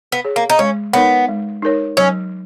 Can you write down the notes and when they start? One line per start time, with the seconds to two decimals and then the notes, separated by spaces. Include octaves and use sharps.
0.12 B3
0.25 G#4 C#5
0.36 A#3
0.50 D#4
0.59 G#3 C#4
0.93 B3 D#4 A#4 C#5
1.29 G#3
1.62 D#4 A#4 C#5
1.97 F#3 C#4